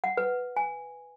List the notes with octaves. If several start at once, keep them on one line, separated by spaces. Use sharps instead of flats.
F#5
B4
G#5